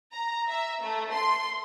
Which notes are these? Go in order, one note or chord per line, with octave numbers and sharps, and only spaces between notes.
A#5
E5
A3
C6